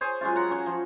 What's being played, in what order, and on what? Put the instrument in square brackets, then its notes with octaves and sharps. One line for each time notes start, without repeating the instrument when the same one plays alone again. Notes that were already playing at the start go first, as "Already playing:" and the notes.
[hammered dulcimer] G#4 C5 C#5
F#3 G#3 C#4 F4
F#5 A#5
F#3 C#4
F3